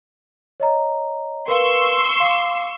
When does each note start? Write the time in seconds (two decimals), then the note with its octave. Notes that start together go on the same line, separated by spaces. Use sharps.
0.60 C#5 D#5 A#5
1.48 A#4 B4 F5 C6 C#6 E6
2.20 F5 D6 C7